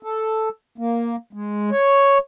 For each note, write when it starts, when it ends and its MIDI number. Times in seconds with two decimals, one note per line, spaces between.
0.03 0.49 69
0.78 1.16 58
1.33 1.70 56
1.71 2.18 73